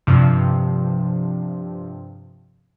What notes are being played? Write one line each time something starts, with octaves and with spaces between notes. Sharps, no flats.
G2 C3 F3